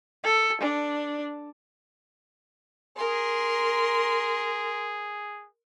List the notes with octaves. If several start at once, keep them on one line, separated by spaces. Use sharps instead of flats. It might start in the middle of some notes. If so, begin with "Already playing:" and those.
A4
D4
G#4 A#4 C6